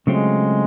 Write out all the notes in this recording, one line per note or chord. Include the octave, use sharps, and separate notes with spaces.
C#3 F#3 G#3 A3 C4 F4